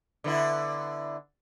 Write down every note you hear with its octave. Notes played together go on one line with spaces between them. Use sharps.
D3 B3 E4